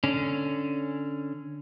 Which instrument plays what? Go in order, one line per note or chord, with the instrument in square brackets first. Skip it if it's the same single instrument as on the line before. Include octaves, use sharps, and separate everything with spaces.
[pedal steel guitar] D3 C#4